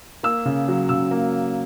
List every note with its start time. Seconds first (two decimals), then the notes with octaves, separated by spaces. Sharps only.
0.23 A#3 E6
0.45 C#3
0.68 F#3
0.89 C#3 E6
1.11 A#3